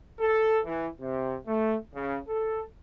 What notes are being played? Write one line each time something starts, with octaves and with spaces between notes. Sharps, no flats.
A4
E3
C3
A3
C#3
A4